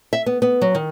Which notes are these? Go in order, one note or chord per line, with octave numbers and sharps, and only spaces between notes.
E5
B3
B3
F#3
D#3